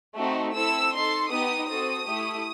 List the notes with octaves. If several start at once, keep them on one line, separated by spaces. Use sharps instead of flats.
A3 C4 D#4 F#4 A4
C4 E4 A4 E6
D#4 A4 C6
B3 D#4 G4 D#6
C4 F#4 A4 D#6
A3 E4 G4